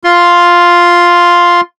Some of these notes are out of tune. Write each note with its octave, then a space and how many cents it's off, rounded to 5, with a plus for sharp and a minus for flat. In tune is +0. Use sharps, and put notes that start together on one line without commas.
F4 +0 C6 +0